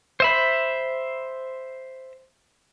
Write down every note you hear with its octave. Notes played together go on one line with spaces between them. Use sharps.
C5 E5 B5